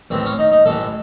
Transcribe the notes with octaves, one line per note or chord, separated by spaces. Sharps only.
A1 A2 E3 C4
C#4
D#4
D#4
A1 A2 E3 A4